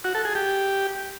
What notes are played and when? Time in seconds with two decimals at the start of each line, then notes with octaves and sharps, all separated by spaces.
0.04 F#4
0.15 A4
0.25 G#4
0.35 G4